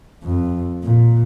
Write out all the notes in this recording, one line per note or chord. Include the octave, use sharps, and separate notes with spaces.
F2
A#2